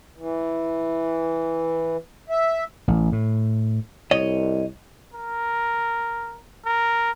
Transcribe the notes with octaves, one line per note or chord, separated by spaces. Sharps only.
E3
E5
A1
A2
C2 C#5 D#5
A#4
A#4